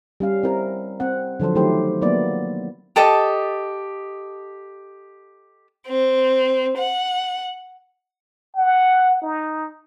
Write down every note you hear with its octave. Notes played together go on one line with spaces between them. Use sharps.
G3 C#4 F5
C4 E4 A#4
C4 F#5
D3 F3 F#3 A4 C5
D#3 F#3 A3 E4 G4 C5
F#3 A#3 B3 E4 D5
G4 A4 D#5 A5
C4
F#5
F#5
D#4